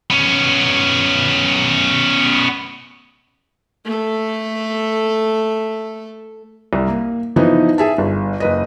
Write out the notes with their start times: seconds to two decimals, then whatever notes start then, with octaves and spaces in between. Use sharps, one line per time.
0.10 B3 C#4
3.85 A3 A4
6.73 C2
6.88 A#3
7.36 E3 F3 B3 D#4
7.78 G#4 E5 A5
7.98 G1
8.40 F#1 B4 D#5